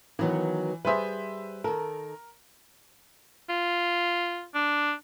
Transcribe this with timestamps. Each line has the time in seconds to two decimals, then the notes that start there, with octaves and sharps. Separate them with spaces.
0.19 D#3 E3 F#3 B3
0.85 G3 G#4 B4 C5 E5
1.64 D#3 A4 A#4
3.50 F4
4.55 D4